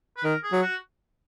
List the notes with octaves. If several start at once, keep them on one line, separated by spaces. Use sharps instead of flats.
B4
D#3 A#4
G#4
F#3
F#4